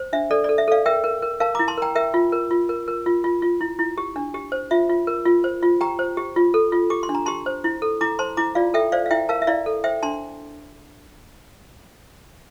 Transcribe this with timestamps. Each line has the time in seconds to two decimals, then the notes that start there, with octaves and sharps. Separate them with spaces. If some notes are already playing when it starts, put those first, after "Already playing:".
Already playing: C5
0.13 D4 E5
0.31 A4 D5
0.44 A4 D5
0.58 E5
0.68 A4 D5 F5
0.86 A#4 E5 G5
1.04 A#4
1.22 A#4
1.40 A#4 F5 A5
1.55 E4 A#5 D6
1.68 A5 C6
1.77 A#4 G5 A#5
1.95 A#4 E5 G5
2.14 F4
2.32 A#4
2.51 F4
2.69 A#4
2.88 A#4
3.06 F4
3.24 F4
3.42 F4
3.61 E4
3.79 E4
3.98 G4
4.16 D4
4.34 G4
4.52 C5
4.71 F4 E5
4.89 F4
5.07 A#4
5.26 F4
5.44 C5
5.63 F4
5.81 G4 G5 A#5
5.99 C5
6.17 G4
6.36 F4
6.54 A4
6.72 F4
6.90 G4 D6
7.03 C6
7.09 D4
7.15 A#5
7.26 G4 A5 C6
7.46 C5
7.64 E4
7.82 A4
8.01 E4 A#5 D6
8.19 C5 A5 C6
8.37 E4 A#5 D6
8.55 F4 D5 F5
8.74 A4 E5 G5
8.92 C5 D5 F5
9.06 F5
9.11 E4 E5 G5
9.29 A#4 F5 A5
9.42 E5
9.47 E4 D5 F5
9.66 A4
9.84 C5 E5 G5
10.03 D4 A5 C6